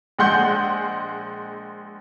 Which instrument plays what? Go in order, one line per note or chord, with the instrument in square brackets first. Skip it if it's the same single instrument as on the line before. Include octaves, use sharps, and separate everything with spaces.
[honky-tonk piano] A#1 G#3 F#5 C6 G6